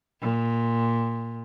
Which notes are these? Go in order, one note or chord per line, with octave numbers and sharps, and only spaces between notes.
A#2